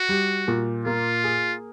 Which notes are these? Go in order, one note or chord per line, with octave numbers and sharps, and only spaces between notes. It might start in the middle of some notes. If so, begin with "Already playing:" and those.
Already playing: F#4
G3
A#2
A#3 F4
G#4